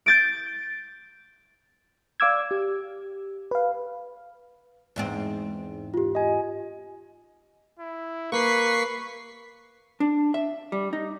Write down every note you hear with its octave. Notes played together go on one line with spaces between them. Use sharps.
G6 A6 D7
D5 F5 D6 E6 G#6
G4
B4 F5
E2 G#2 C4
F4 G4
D#5 G#5
E4
A#3 B4 C#6 B6 C7
D4
E5
G3
D#4